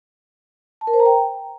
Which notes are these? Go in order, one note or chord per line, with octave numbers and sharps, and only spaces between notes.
A5
A#4
C5
A#5
G5